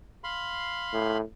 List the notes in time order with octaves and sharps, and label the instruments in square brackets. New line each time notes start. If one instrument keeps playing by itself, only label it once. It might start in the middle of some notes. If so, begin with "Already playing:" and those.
[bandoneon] F5 B5 C6
[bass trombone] A2